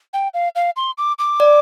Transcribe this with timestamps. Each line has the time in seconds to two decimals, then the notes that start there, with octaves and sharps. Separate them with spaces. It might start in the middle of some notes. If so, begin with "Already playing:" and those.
0.14 G5
0.34 F5
0.55 F5
0.76 C6
0.98 D6
1.19 D6
1.40 D5